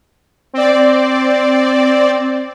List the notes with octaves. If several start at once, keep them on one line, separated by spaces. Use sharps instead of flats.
C4 D5